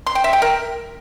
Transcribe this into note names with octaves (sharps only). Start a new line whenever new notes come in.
C6
G5
E5
G5
A#4